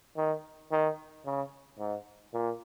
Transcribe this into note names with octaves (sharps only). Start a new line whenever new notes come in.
D#3
D#3
C#3
G#2
A#2